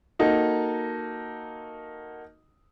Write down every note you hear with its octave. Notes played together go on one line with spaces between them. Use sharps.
A#3 D#4 F#4 A4